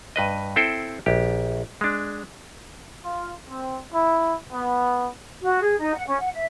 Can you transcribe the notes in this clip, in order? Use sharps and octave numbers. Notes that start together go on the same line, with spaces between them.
G2 B4 D#5
C4 E4 A4 C5 G5
A#1 G4
G#3 D4
F4
C4
E4
B3
F#4
G#4
D#4
F#5
C#4
F#5
E5